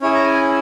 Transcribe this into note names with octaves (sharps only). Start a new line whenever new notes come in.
C#4 E4 G#4 C#5
A#5
G#5